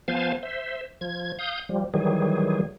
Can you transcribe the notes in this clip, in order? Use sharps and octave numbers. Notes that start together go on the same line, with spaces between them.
F3 B3 C5 F5 G#5 A5
C5 E5
F3 G#6
F5 D#6 G6
F3 G3
D#3 E3 F#3 G3 G#4